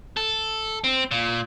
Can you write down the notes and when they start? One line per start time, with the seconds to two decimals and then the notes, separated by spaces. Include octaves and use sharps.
0.17 A4
0.84 C4
1.11 A#2